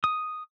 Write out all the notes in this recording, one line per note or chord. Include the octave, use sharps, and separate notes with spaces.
D#6